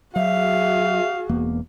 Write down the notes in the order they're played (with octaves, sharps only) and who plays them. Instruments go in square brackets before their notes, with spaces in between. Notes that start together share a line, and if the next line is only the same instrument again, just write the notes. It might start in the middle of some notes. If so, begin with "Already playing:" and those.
[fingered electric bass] F#3 [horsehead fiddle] F#4 G#4 [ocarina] E5 [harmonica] F5
[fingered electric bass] E1 E2 A#3